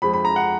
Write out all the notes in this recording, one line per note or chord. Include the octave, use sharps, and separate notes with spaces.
F2 F3 G#3 B5
B5
A#5
F#5